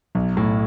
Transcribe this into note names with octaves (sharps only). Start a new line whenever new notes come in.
B1
A2